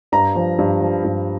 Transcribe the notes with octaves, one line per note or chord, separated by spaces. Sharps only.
G2 A#5
F3
G2
F3
G2